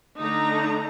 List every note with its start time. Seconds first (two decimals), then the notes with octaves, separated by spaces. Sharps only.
0.20 D3 A3 D4 D#4 A#5